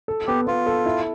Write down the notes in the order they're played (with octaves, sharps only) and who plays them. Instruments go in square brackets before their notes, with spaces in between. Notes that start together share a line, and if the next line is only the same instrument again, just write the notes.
[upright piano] A4
[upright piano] B3 [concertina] G4
[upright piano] B3 [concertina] F4
[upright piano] A4
E4